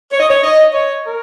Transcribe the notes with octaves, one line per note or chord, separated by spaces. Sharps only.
C#5
D#5
C#5
D#5
C#5
A#4